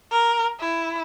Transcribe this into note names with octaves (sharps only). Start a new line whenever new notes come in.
A#4
E4